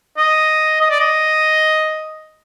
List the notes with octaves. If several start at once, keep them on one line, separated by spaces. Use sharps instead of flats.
D#5
D#5
D5
D#5